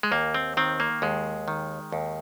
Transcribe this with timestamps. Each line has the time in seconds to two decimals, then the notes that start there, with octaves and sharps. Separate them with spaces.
0.03 G#3
0.12 D#2 A#3
0.34 C4
0.57 D#3 C4
0.80 A#3
1.02 D#2 G#3
1.48 D#3
1.92 D#2